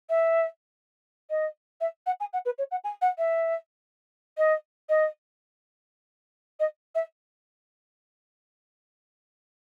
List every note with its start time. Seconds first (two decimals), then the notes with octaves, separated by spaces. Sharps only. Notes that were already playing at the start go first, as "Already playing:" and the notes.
0.09 E5
1.30 D#5
1.81 E5
2.06 F#5
2.20 G#5
2.33 F#5
2.45 B4
2.58 C#5
2.71 F#5
2.84 G#5
3.01 F#5
3.18 E5
4.37 D#5
4.89 D#5
6.60 D#5
6.95 E5